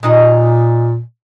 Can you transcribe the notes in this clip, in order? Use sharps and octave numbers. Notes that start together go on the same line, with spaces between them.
A#2 G#3 D#4 D#5